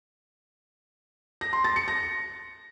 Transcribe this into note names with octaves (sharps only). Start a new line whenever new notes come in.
A#6
C6
A6
C#7
A#6